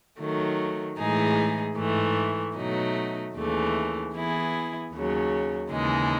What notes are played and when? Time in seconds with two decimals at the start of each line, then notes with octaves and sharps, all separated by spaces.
0.19 D#3 F#3 A3
0.98 A2 E3 G#3 D#4 G#4
1.77 G#2 E3 A3
2.55 B2 F#3 A3 D#4
3.34 D#2 C#3 E3 A3
4.13 E3 B3 E4 G#4
4.92 D#2 C#3 F#3
5.71 D#2 C#3 E3 G#3 D#4